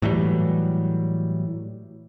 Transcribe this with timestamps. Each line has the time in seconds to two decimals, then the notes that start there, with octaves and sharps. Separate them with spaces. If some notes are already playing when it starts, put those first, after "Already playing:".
0.02 A2 E3 F#3 G3